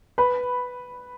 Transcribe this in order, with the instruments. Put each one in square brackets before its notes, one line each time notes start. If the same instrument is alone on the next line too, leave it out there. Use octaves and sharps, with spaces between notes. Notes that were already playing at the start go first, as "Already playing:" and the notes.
[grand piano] B4 B5